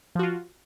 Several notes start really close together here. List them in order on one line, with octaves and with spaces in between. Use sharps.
F3 F#4 F4